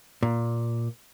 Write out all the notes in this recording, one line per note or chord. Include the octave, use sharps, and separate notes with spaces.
A#2